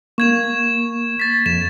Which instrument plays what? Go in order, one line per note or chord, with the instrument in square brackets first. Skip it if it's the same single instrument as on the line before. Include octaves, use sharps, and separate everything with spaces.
[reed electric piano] A#3 [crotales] C#6 G#6 E7
[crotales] A6 B6
[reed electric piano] F2 [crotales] E7